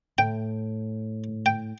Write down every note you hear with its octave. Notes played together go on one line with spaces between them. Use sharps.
A2 G5
G5